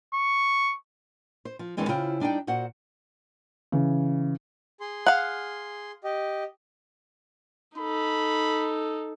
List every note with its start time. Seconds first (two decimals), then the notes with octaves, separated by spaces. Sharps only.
0.14 C#6
1.45 C5
1.59 F3
1.77 F#2 D#3 E3 G#3 C4 D4
1.88 C#3 E4 F4 C5 G5
2.20 G3 D4 D#4 D5 G5
2.47 A#2 F#4 C5 F#5
3.72 C#3 E3
4.81 G#4 C6
5.07 F5 F#5
6.04 G4 D#5
7.77 D#4 A4 B5